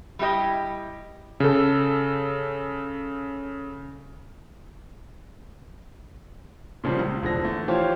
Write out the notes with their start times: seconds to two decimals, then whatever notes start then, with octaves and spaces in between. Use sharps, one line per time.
0.19 G3 E4 G4 D#5
1.40 C#3 A4
6.84 A#2 C#3 F3 G3
6.99 C#2
7.22 E1 D3 F3 A#6
7.43 E3 A3
7.68 E3 F3 F4 G4 C5 C#5